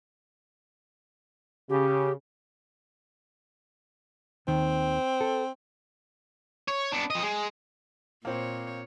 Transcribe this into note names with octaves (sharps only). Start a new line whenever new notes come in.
C#3 G4
D#2 D#3 C4
A4
C#5
B3 D4
F3 D#5
G#3
A#2 A#3 C4 C5 C#5